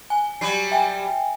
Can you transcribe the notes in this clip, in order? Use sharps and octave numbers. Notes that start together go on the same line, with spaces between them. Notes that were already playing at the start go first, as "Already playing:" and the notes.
G#5
F#3 G3 C7
E5 G5 G#5